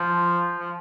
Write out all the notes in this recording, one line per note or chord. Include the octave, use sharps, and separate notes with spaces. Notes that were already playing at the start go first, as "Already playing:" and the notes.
Already playing: F3
F3